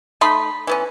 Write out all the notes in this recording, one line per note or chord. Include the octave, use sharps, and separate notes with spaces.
A3 D#4 B5 C6
E3 B3 C#4